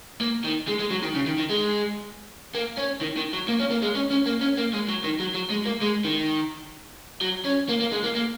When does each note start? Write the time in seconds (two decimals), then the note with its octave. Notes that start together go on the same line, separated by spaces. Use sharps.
0.21 A#3
0.45 D#3
0.68 G#3
0.80 G#3
0.91 F#3
1.03 D#3
1.15 C#3
1.26 D#3
1.38 D#3
1.50 G#3
2.55 A#3
2.78 C#4
3.01 D#3
3.17 D#3
3.33 F#3
3.48 A#3
3.60 C#4
3.71 A#3
3.83 G#3
3.95 C#4
4.11 C#4
4.26 A#3
4.41 C#4
4.57 A#3
4.73 G#3
4.88 F#3
5.04 D#3
5.20 F#3
5.34 F#3
5.50 G#3
5.65 A#3
5.82 G#3
6.05 D#3
7.22 F#3
7.45 C#4
7.69 A#3
7.80 A#3
7.92 G#3
8.03 A#3
8.15 A#3